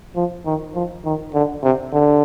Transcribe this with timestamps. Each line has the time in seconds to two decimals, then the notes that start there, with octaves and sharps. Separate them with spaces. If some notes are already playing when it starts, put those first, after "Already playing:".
0.16 F3
0.46 D#3
0.75 F3
1.05 D#3
1.34 D3
1.63 C3
1.93 D3